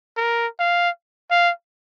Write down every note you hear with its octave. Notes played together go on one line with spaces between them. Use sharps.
A#4
F5
F5